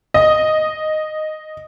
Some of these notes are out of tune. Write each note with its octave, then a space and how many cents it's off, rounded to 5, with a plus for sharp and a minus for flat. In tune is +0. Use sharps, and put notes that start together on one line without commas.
D#5 -5